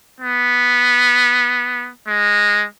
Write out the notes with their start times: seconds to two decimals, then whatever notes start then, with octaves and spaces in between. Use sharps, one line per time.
0.21 B3
2.08 G#3